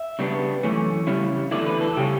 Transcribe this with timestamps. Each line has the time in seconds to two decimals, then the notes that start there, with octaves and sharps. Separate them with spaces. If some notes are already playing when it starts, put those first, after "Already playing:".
Already playing: E5
0.19 C#3 G3 B3 D4
0.63 F#2 E3 A3 C#4
1.07 C#3 G3 C#4 E4
1.51 E2 D3 A3 E4 D5
1.66 B4
1.81 A4
1.97 C#3 G3 C#4 G4